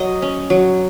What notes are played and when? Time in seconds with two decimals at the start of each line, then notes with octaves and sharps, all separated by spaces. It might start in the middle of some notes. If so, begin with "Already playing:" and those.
Already playing: F#3 D#5
0.22 C#4
0.50 F#3